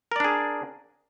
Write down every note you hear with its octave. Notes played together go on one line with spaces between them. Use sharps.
D4 G#4 A#4 D5